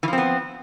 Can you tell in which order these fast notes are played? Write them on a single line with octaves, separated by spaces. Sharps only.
E3 F3 C4 B3